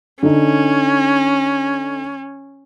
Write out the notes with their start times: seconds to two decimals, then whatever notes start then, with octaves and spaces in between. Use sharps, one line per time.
0.23 D3 C#4 D#4